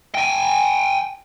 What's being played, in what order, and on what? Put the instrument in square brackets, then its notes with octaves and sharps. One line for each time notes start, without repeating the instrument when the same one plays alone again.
[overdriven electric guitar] G5 G#5